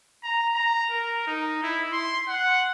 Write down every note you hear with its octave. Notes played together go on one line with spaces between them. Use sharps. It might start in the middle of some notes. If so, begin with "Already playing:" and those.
A#5
A#5
A#4
D#4
E4
C6
F#5